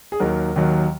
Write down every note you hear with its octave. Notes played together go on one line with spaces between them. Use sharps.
G#4
D#2 D#3 F#3 A#4
D#2 D#3 F#3